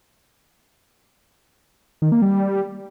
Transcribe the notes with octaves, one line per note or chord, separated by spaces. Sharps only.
D#3
A#3
G3